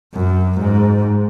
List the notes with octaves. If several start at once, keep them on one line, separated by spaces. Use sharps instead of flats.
F#2
G#2